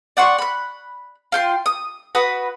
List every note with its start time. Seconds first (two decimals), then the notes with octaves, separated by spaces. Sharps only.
0.17 D5 F#5 C6 C#6
0.39 B5 F#6
1.32 F4 G5 C6
1.66 D#6
2.15 F#4 B4 B5 D#6